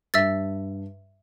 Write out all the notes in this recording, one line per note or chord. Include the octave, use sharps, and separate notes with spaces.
G2 E5 E6 A6